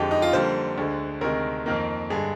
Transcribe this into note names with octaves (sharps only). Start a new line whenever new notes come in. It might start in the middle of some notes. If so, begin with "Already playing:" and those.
Already playing: F2 D3 G#3 G4
D#4
F4
F2 D3 G3 A#3 C5
D2 D3 G#3
D2 C3 D#3 G#3 A#4
F2 D#3 A#3
G2 D3 G#3 G#4